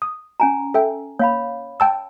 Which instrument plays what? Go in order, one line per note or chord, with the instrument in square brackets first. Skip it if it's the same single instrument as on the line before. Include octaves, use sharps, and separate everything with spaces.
[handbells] D#6
[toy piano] C#4 G#5 A#5
[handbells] A4 E5 G5
[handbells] A#3 [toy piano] C#5 F5 B5
[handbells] G5 A5 E6